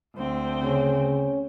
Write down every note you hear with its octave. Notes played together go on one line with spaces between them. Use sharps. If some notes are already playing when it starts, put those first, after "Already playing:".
D2 C4
C#3 C#4